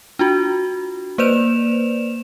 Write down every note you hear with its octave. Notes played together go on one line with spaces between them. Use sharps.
D4 F4 F#4
A#3 B4 C5 D5 E7 F7